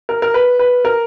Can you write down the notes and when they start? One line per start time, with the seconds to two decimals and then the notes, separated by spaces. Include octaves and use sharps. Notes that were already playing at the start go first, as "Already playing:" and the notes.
0.09 A#4
0.22 A#4
0.34 B4
0.59 B4
0.85 A#4